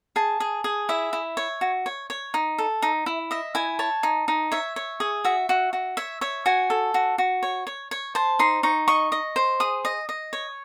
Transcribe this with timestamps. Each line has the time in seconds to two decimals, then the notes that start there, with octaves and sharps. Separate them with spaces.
0.16 G#4 A5
0.40 G#4
0.64 G#4
0.89 E4 E5
1.13 E4
1.37 C#5
1.61 F#4
1.86 C#5
2.10 C#5
2.34 D#4
2.58 A4
2.82 D#4
3.06 E4
3.31 D#5 E5
3.55 E4 G#5
3.79 C#5 A5
4.03 D#4
4.28 D#4
4.52 C#5 E5
4.76 C#5
5.00 G#4
5.24 F#4 E5
5.49 F#4
5.73 F#4
5.97 C#5 E5
6.21 C#5 E5
6.46 F#4 G#5
6.70 A4
6.94 F#4
7.18 F#4
7.43 C#5
7.67 C#5
7.91 C#5
8.15 C5 A5
8.39 D#4 C6
8.63 D#4 C#6
8.88 D#5 C#6
9.12 D#5
9.36 C5
9.60 G#4 D#6
9.85 D#5
10.09 D#5
10.33 C#5